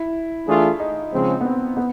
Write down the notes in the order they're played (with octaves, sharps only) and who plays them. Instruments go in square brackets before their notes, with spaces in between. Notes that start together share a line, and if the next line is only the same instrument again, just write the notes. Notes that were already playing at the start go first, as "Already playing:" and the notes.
Already playing: [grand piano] E4
[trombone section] E3 A3 D4 F4 G#4
[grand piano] D#4
[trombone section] C#3 F3 G#3 C4
[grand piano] B3
C4
B3